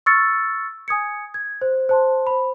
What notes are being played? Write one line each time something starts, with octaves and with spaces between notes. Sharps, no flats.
C#6 E6 F6 A6 C#7
G#5 D#6 G#6 C#7
G#6
C5
C5 A5 C6
C5 B5